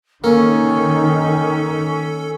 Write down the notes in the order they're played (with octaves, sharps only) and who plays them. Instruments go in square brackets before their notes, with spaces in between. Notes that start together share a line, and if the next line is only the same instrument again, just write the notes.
[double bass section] D#3 [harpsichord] A#3 [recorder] C#4 [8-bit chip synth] A4